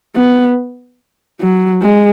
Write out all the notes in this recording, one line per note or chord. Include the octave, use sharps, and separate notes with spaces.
B3
F#3
G#3